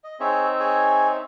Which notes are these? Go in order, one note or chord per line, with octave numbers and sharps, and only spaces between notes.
D#5
C4 D#4 G#4 C#5 E5
G#4 C#5 G#5